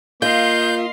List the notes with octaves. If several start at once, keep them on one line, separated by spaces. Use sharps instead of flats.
A#3 F4 D#5 F5 C6 G6